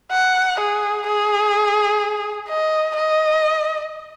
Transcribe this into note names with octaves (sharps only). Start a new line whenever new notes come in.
F#5
G#4
G#4
D#5
D#5